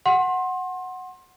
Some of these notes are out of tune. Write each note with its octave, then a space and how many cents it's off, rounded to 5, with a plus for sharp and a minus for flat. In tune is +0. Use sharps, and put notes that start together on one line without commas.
F#5 +0 C6 +25